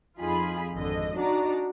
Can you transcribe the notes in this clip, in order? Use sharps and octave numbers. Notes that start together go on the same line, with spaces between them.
F2 D#4 F4 G#4 B5
G#1 F2 D3 D#5
D4 D#4 F#4 D5 A#5